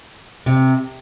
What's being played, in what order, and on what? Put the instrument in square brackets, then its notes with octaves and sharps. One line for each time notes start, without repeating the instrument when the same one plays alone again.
[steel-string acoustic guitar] C3